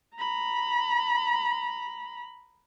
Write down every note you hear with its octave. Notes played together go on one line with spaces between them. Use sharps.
A#5 B5